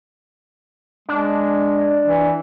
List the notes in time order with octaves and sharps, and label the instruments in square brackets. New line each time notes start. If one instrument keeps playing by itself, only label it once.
[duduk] G#3 [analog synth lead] D4
[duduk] E3